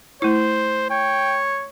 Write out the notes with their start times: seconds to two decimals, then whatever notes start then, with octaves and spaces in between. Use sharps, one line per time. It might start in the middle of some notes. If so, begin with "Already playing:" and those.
0.22 A3 E4 C5
0.90 C#5 G5